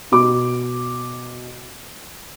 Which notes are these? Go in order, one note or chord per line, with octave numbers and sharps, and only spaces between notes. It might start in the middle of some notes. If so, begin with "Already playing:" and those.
B2 D6